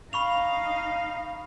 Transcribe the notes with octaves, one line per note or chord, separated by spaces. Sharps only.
D#4 F5 B5 C#6 F7